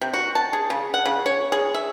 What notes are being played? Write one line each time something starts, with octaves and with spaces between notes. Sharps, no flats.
C3
F#4
A5
G#4
C#3
F#5
C#3
C#5
G#4
E5